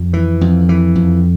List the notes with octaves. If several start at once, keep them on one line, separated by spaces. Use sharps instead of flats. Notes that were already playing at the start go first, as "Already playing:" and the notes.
Already playing: F2
E3
F2
E3
F2